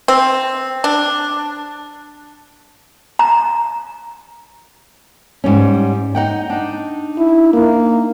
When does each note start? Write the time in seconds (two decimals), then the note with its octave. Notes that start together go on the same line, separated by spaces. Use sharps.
0.08 C4
0.84 D4
3.19 A#5
5.44 G#2 G3 C#4
6.15 D#4 F#5 G5
6.50 D4 D#4
7.18 E4
7.54 A#3